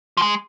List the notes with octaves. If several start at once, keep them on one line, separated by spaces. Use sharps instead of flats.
F3
G#3